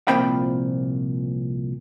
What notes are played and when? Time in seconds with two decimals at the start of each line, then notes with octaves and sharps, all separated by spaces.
0.08 C2 A#2 F3 C4 G5 B5